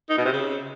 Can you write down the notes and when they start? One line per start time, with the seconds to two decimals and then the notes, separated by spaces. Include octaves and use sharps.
0.10 D#4
0.17 B2
0.25 C3
0.33 C#3